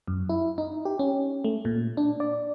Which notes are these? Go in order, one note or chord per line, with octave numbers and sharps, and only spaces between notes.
F#2
E4
D#4
G4
C#4
A3
A#2
D4
D5